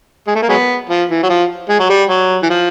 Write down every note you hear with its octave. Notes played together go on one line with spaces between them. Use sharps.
G#3
A3
A#3
F#3 G#3 B3
F3
E3
F#3
F3
G#3
F#3
G3
F#3
E3
F3